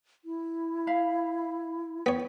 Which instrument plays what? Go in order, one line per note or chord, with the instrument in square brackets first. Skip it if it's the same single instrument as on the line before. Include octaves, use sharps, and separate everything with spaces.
[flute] E4
[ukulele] E5 F5 B5
[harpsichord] B3 C#5 [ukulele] G5